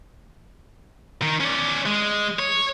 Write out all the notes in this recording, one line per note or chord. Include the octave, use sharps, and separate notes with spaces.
D#3
C#4 D5
G#3
C#5